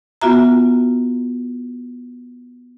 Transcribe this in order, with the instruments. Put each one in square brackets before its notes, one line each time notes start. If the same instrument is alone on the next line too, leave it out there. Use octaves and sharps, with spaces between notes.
[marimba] B3 F4 F#4 E5 A#5